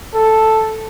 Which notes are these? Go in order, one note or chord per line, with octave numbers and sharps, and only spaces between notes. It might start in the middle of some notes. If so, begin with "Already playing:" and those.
A4